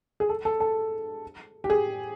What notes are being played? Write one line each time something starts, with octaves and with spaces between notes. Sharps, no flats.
G#4
A4
A4
A4
G4
G#4